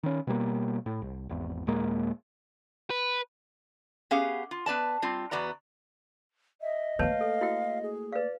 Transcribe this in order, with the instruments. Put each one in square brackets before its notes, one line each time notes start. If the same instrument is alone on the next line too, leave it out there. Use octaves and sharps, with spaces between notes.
[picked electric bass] D#3 C#4
B2 G3 A#3
A2
C2
G#1 E2
D#2 A#2 G#3 A#3
[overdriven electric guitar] B4
[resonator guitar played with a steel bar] B3 C#4 G4 G#4 F5 F#5
F4
B3 B4 D5 A5
G3 C4 F4
E2 B3 F#4 D5 A#5
[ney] D#5 [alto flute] E5
[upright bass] A3 A#3 [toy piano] B4 C#5 A5 [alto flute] F5
[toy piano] A4
E4 F#4 G5
[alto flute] G#4
[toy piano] B4 F5 [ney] D5